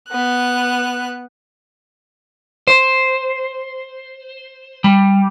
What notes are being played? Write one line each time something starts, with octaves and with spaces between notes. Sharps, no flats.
B3 F#6
C5
G3